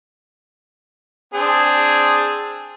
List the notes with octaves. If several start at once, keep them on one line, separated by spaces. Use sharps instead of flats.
C4 D4 G#4